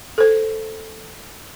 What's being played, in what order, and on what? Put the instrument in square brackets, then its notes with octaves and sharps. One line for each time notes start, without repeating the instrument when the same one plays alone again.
[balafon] A4 C5